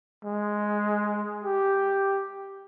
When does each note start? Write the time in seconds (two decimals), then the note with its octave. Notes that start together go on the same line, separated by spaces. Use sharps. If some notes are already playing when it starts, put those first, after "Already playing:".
0.25 G#3
1.44 G4